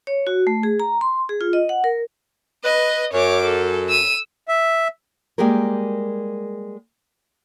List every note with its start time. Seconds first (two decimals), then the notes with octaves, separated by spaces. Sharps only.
0.07 C#5
0.27 F#4
0.47 A3
0.63 G#4
0.80 A#5
1.01 C6
1.29 G#4
1.41 F4
1.53 D#5
1.69 F#5
1.84 A#4
2.64 B4 D#5
3.13 F#2 C#5 D6
3.44 A4
3.89 E6 D#7
4.48 E5
5.38 G3 G#3 A#3 G4 G#4 A#4